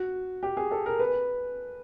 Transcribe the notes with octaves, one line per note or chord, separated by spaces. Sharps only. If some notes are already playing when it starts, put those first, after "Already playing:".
Already playing: F#4
G4
G#4
A4
A#4
B4